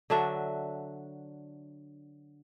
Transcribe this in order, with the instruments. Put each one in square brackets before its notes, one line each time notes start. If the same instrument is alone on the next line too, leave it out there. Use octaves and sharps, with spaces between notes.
[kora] D3 F#3 D4 E5